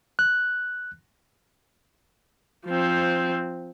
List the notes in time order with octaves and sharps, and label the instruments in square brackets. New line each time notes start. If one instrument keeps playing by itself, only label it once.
[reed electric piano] F#6
[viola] F3 C4